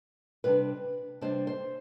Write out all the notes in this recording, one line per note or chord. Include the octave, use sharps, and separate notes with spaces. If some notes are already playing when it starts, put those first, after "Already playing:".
C3 G3 D4 B4
C3 G3 D4 C5
C5